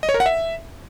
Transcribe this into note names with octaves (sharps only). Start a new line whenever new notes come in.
D#5
C#5
A#4
F#5
E5